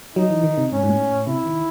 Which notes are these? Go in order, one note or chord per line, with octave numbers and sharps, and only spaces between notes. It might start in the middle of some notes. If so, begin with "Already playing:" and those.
F#3 D#4
E3
D#3
C3
G#2 C#4
G#2
A2
A2
C3 E4
D#3